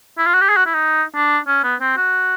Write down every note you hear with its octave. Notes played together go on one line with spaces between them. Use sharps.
E4
F4
F#4
G4
G#4
F#4
E4
D#4
D4
C#4
B3
C4
F#4